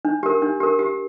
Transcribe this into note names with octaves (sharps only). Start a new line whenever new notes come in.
D4
G4 A#4
D4
G4 A#4
G4